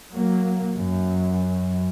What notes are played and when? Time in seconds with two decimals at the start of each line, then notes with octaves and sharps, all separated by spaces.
0.13 F#3 A#3
0.77 F#2